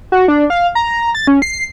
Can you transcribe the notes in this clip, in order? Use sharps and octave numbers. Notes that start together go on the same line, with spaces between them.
F#4
D4
F5
A#5
A6
C#4
C7